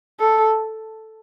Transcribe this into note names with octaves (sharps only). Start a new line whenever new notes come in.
A4